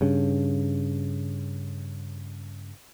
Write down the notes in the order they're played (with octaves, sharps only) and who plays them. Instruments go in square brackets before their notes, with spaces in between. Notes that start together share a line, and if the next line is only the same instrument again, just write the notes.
[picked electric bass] G2 C#3